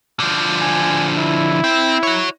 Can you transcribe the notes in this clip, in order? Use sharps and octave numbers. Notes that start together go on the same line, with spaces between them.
D3 F3
G#5
E4
C4
F#4 C#5